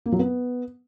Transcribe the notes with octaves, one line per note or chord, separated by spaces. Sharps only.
A#3
F#3
B3